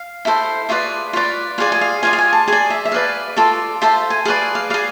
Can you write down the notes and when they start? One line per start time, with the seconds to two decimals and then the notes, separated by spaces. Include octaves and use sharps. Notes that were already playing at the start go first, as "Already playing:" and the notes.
Already playing: F5
0.25 E4 A4 C5
0.69 F4 G#4 B4 D5 E5
1.13 F4 B4 D5
1.58 F4 G#4 D5 F5
1.72 G#5
1.81 F5
2.03 F4 G#4 D5 G#5
2.13 F5
2.18 G#5
2.33 A5
2.48 G#4 D5 G#5
2.70 E5
2.85 E5
2.91 G#4 B4 D5 F5
3.37 F4 A4 D5
3.82 F4 A4 C5 E5
4.10 G#5
4.25 G#4 B4 D5 F5
4.55 F5
4.70 D5 F5
4.74 G#4